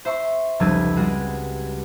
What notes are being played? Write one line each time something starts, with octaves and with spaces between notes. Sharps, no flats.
C5 E5 C6 C#6
F1 C#2 G3 B4 E6 G#6
G3 G#3 F#4 G#4